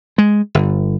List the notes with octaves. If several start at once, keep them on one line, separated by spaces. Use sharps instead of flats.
G#3
G1